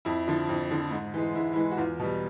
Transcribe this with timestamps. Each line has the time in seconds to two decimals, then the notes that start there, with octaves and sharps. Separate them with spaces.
0.05 F2 E4
0.28 D3 F3
0.49 F2
0.71 D3 F3
0.91 G#2
1.14 E3 G#3
1.35 G#2 E4
1.53 E3 G#3 E4
1.71 F#4
1.77 E2 F4
1.99 B2 G3